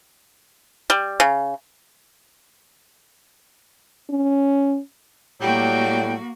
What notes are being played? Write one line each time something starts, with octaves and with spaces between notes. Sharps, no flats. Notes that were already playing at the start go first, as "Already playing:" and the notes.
G3
C#3
C#4
A2 F#3 G3 A#3 F#4 G5